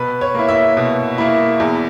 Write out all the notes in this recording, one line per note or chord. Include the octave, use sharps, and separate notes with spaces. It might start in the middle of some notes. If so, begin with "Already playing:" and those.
Already playing: B2 B4
C#5
A#3 E4
E5
B2
A#3 E4
E2